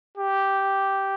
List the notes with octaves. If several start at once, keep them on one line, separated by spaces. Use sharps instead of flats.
G4